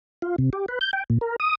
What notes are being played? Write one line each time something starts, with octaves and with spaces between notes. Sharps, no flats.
F4
C3
G4
B4
G6
G5
A#2
A#4
D#6